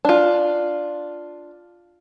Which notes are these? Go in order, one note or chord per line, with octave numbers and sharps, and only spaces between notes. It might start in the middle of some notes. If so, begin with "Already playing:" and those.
D4 F4